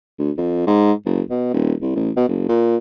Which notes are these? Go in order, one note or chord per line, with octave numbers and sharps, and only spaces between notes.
D2
F2
G#2
F#1
B2
D#1
C2
A1
B2
F#1
A#2